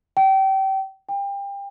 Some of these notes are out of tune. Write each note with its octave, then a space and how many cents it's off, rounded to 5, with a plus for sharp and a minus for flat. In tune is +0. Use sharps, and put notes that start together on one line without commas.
G5 -30
G5 +30